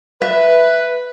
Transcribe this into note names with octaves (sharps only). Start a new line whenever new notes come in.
B4 E5